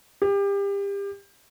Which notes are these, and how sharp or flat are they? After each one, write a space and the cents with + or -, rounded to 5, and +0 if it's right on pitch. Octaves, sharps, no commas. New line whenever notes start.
G4 +30